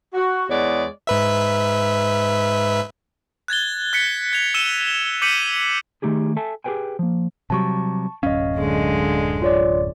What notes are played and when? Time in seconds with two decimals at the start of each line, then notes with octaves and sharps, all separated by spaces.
0.14 F#4
0.50 E2 G#3 B3 C#5 D5
1.07 G#2 B4 E5
3.48 F#6 G#6 A6 G7
3.93 F#6 B6 C#7
4.33 G#6 F7
4.54 E6 C#7 D#7 E7 G7
5.22 D6 G6 B6 C#7 D#7 F#7
6.02 D#3 F#3 A3 D#4 G4 G#4
6.37 A4 E5 G#5 A5
6.64 G4 G#4 A#4 B4 G5 G#5
6.99 F3 A#3
7.50 C3 F#3 G3 A5 C#6
8.23 D1 F#2 C#4 D#5 F5
8.57 D3 G#3
9.42 F4 C#5 D5